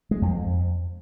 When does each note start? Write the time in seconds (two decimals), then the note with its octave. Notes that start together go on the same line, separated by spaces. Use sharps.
0.11 G#3
0.22 F2
0.32 F2